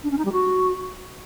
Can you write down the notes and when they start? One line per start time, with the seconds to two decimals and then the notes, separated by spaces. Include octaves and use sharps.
0.04 D4
0.11 C#4
0.18 D#4
0.25 G3
0.32 F#4